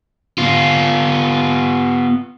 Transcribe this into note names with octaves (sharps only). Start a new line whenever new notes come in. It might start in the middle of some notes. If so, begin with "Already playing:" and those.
B3 F4